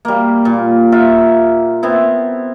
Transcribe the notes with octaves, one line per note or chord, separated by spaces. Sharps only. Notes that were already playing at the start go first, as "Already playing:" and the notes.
G3 A#3
A#2
F4 E5 F#5
B3 C4 E4